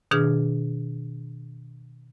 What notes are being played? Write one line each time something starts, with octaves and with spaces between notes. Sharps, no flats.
B2 D#3 D4 G#4 F6